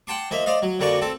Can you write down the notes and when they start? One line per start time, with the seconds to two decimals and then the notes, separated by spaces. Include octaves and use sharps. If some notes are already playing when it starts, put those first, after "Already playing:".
0.07 F#5 G5 A5 C6 D6
0.31 F3 A#3 D#5 E5
0.46 C5 D5 D#5 F5
0.62 F#3
0.79 F2 D3 A#3 F#4 D5 C#6
1.01 C4 A4